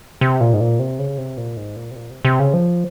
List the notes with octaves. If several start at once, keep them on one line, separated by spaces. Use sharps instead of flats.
C3
A#2
G#2
A#2
C3
C#3
C3
A#2
G#2
A#2
C3
A#2
C3
C3
C#3
F3